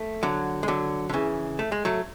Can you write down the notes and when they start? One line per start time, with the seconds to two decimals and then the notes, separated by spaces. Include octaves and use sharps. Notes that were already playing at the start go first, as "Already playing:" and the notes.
Already playing: A3
0.23 D3 F#3
0.63 G#3
0.68 D3 F#3
1.09 D3
1.14 C#3 E3
1.59 A3
1.72 G#3
1.85 F#3 A3